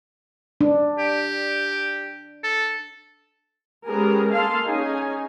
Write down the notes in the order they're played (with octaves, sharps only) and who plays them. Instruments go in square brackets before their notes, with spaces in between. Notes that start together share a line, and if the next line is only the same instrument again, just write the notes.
[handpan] D4
[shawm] G4
A4
[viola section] G#3 B3 C#4 G4 G#4 A#4
A#3 G#4 A4 F5 A5 C6
C#4 D#4 G#4 G#5